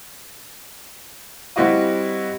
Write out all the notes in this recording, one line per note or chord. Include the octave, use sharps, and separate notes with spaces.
G3 C4 E4 F#4 D#5 F5